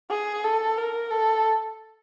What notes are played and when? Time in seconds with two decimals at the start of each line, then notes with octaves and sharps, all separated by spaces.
0.10 G#4
0.44 A4
0.77 A#4
1.11 A4